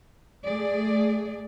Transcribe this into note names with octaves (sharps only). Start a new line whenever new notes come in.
A3 G#4 D5